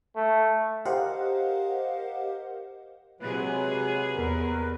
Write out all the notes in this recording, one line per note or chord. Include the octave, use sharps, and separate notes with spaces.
A3
G4 A#4 C5 D#5 F5 F#5
C3 F#3 G#3 G#4 B4
E2 A#4